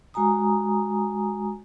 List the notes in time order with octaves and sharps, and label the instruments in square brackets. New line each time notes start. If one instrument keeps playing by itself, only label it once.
[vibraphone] G#3 F#4 G#5 A#5 D#6